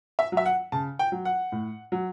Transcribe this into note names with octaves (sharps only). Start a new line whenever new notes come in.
E5
F#3
E5
F#5
C#3 A5
G5
F#3
F#5
A2
F#3